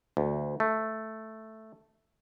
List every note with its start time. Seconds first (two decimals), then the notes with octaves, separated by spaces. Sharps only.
0.17 D2
0.60 A3